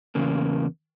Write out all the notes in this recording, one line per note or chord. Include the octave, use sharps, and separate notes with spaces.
E2 C#3 A#3